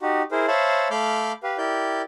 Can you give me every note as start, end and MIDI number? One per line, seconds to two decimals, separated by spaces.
0.02 0.22 63
0.02 0.22 66
0.02 0.22 67
0.32 0.46 64
0.32 0.46 68
0.32 0.46 70
0.32 0.46 72
0.48 0.88 72
0.48 0.88 73
0.48 0.88 76
0.48 0.88 77
0.48 0.88 81
0.48 0.88 83
0.91 1.32 57
0.91 1.32 77
0.91 1.32 83
0.91 1.32 86
0.91 1.32 89
0.91 1.32 91
1.43 1.57 67
1.43 1.57 71
1.43 1.57 77
1.58 2.02 64
1.58 2.02 67
1.58 2.02 70
1.58 2.02 74
1.58 2.02 91